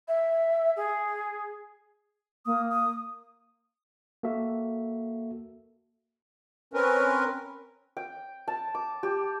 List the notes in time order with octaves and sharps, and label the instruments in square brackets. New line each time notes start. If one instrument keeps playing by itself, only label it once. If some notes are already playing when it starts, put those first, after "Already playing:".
[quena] E5
G#4
[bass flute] A#3 [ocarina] D#6
[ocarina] D#6
[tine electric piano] A#3 F#4 A4 E5
[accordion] C4 C#4 A#4 B4
[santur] G5
A5
D6
G4